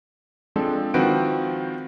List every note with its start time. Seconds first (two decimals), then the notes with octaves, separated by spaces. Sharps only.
0.56 F3 G#3 C4 D4 A4
0.94 D#3 F3 C4 F#4 B4 D7